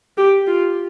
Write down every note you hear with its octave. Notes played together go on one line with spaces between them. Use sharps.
G4
F4